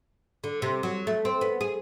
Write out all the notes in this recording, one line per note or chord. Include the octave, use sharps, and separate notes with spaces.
D3
C3
F#3
A3
C4
B3
G#4